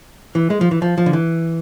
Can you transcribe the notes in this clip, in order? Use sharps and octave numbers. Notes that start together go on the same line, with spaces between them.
E3
G#3
F3
E3
F3
F3
D3
E3